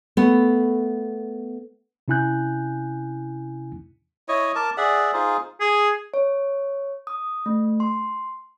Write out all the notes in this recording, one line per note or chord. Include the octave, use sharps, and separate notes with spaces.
A3 B3
C3 C#4 E4 G#5 F#6 G6
E4 C#5 D#5
A#4 A5 D6
G#4 D5 E5 F#5
D#4 F4 G#4 C5
G#4
C#5
D#6
A3
C6